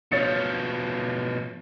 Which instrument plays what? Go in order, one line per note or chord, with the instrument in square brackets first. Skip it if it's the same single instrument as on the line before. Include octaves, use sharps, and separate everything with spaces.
[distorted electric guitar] B2 F3 [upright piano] C#5 A6 C#7